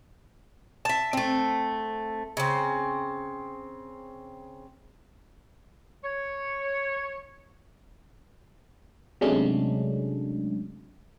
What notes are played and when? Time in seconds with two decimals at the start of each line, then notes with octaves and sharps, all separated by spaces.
0.85 E5 A5
1.13 A3 C4
2.37 C#3 C4
6.04 C#5
9.21 C3 F#3 G#3 A3 C#4 D4